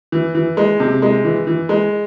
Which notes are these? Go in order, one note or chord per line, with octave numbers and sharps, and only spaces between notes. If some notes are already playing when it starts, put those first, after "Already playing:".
E3
E3
G#3
C3
G#3
E3
E3
G#3